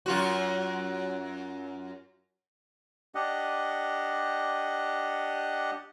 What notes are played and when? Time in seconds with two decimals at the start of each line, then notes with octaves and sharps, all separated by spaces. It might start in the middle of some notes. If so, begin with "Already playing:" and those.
0.06 F#2 F4 F#4
3.15 D4 G4 D#5 F#5